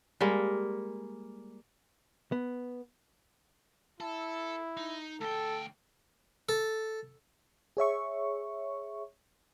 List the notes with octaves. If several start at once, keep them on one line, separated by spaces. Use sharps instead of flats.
G3 G#3 A#3
B3
E4 A4
D#4
D2 A4 G5
A4
G#4 C#5 E5 C#6